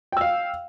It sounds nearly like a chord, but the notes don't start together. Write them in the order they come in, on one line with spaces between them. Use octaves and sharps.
G5 E6 F5